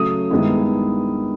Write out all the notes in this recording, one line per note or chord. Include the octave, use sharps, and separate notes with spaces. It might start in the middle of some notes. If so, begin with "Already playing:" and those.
Already playing: C#3 F#3 A3 D#6
G2 D#3 G#3 B3 E4